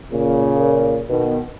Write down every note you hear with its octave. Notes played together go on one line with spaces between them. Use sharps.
A#2 C#3
B2 D#3